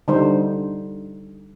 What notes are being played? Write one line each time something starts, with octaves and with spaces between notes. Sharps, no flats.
D3 G3 D#4 C5